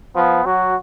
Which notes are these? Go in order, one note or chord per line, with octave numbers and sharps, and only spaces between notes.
F3 B3
F#3 F#4